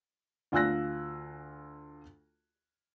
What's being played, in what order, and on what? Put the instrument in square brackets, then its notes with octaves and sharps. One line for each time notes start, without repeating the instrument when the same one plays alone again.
[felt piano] D2 F4 G#5 E6 F#6 A#6